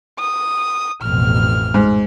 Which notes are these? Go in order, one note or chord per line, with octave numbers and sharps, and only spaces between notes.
D#6
A1 F2 B2 F6
G#2